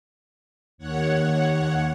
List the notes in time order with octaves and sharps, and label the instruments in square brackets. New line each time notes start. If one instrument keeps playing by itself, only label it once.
[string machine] D#2 C#5 F#5